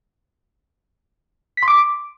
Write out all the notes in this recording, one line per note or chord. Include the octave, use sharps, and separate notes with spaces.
B6
C6
D6